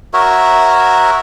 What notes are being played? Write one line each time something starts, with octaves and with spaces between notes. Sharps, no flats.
F#4 A#4 C#5 E5